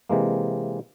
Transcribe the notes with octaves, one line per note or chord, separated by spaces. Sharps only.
C3 E3 G#3 A#3